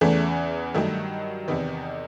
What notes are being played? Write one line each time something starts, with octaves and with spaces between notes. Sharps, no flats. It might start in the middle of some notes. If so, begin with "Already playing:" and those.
E2 C#3 E3 A3
G2 D#3 F#3 A3
E2 C3 D#3 B3